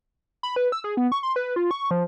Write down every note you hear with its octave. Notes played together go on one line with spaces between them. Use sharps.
B5
B4
E6
G#4
B3
C#6
C6
B4
F4
C#6
F3